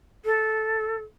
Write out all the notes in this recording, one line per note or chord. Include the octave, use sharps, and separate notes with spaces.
A4